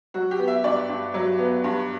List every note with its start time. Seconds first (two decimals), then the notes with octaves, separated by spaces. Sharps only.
0.14 F#3 F#4
0.31 G4
0.39 B3
0.47 E5
0.64 G2 D5
0.89 G2
1.14 F#3
1.39 B3
1.64 G2